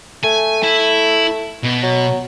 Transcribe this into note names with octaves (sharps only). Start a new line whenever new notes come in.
A3 G#5
E4
B2
F#3